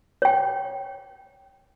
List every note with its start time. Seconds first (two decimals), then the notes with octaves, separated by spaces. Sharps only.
0.22 C#5 G5